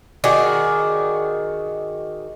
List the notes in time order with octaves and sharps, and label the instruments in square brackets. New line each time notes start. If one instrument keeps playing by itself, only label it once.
[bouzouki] D#3 F#4 G#4 D5